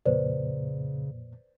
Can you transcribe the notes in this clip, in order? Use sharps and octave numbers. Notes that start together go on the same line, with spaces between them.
F2 A#2 C#3 B4 C5 D5